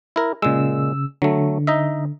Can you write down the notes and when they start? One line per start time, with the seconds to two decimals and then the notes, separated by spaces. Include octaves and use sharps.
0.16 E4 A#4
0.42 A#2 C#3 G#3 E6
1.22 D3 F#3 A3
1.67 D#4 D#5 E5